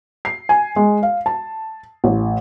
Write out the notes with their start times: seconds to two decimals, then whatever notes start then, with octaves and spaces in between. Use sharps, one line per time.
0.25 C7
0.49 G#5
0.76 G#3
1.03 F5
1.26 A5
2.04 A1